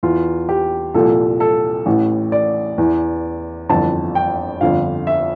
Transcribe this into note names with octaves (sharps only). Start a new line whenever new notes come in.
E2 E3 F4
G4
C2 A#2 F3 A4
A4
A1 A2 E3
D5
E2 E3
G1 F2 E3 A5
G5
G1 F2 D3 F3 F5
E5